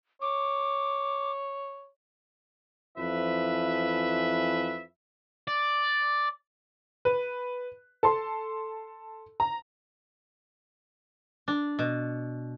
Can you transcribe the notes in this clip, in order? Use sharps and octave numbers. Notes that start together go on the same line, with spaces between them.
C#5 D6
F2 E3 F3 B4 E5
D5
B4
A4 A5 C6
A#5
D4
B2